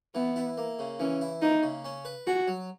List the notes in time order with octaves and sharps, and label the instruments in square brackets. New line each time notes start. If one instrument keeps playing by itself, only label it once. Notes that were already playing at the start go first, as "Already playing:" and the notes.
[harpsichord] E3 [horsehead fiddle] B3
[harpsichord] E4
A#3
C#3
[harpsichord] E3 [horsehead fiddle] C#4
[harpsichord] E4
[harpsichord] A#3 [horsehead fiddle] D#4
[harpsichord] C#3
C#4
B4
[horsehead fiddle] F#4 [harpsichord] G#4
[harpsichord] F#3